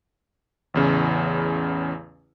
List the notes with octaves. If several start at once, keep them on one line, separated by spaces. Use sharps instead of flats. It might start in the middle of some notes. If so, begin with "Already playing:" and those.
A1 E2 C#3